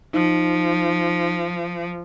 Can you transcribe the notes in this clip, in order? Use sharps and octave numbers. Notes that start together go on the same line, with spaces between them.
F3 D#4